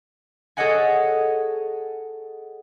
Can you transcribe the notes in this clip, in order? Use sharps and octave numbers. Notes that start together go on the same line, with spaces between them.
G#4 A4 C#5 D#5 F#5 G#5